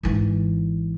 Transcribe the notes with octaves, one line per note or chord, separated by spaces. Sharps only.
G#1 E3